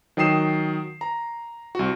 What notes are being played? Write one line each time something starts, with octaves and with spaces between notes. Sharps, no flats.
D#3 F#3 G5 D#6 C7 E7
A#5
C2 F#4